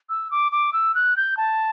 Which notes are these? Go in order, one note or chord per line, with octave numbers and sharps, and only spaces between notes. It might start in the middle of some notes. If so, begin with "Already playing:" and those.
E6
D6
D6
E6
F#6
G6
A5